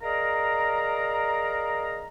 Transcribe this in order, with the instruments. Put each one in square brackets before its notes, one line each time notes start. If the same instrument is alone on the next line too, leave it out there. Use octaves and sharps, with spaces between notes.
[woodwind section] G#4 A#4 D5 D#5 F5 A#5